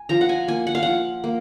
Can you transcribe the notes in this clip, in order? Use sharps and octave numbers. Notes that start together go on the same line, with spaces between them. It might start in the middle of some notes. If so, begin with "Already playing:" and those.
Already playing: G#5
F3 A#5
F#5
G#5
A#3 G#5
F#5
F5
F3 F#5
A#3